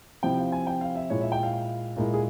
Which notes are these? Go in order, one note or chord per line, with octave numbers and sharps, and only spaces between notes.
C3 F3 C4 E4 G5
F5
G#5
G5
F5
E5
A#2 G#3 E4 C#5
E5
G5
F5
A#2 G#3 E4 A#4
G#4